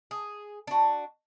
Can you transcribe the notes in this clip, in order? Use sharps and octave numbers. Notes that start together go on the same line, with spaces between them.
G#4
D4 F#4